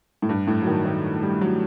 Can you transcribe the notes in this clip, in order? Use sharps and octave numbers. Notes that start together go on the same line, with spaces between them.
A2
G2
A2
F#3
D#3
D#3
G3
F#3